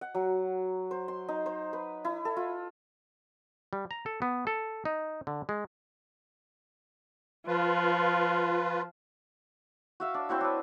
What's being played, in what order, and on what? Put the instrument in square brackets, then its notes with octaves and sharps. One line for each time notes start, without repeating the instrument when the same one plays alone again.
[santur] F#5
F#3
C5
C6
D#4
C5
B4
E4
A4
F4
[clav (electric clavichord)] G3
A#5
A4
B3
A4
D#4
D3
G#3
[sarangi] F3 [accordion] F4 B4
[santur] F#4 E5 F5
D4
C4 E4 F#4 C#5
D4 B4